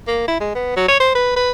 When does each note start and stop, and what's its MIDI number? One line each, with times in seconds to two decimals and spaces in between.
0.07 0.24 58
0.28 0.36 64
0.40 0.51 56
0.55 0.73 59
0.76 0.86 54
0.88 0.99 73
1.00 1.13 72
1.15 1.33 71
1.36 1.52 71